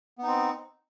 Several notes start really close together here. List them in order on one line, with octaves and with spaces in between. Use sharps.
B3 D#4 C4